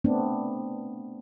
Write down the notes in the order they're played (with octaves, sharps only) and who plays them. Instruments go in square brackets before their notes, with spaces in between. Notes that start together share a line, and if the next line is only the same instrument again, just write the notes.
[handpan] A3 B3 C4 D4